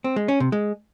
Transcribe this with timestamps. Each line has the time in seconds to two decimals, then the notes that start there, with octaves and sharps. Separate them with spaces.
0.04 C4
0.16 G#3
0.28 C#4
0.40 C3
0.52 G#3